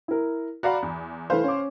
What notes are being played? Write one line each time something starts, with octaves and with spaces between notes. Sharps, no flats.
E4 A#4
F#4 D5 F5 A#5 B5
E2
E3 A3 B4 C5 F5
C#4 D6